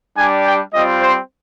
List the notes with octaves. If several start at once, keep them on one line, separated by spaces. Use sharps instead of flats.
G3 D4 G4 G#5
G5
G3 C4 F4 D#5
C5